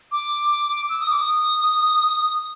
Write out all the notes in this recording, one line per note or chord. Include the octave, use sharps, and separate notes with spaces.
D6
E6
D#6
D6
D#6